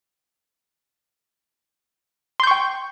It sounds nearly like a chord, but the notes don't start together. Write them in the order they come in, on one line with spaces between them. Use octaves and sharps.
C6 G6 C#6 G5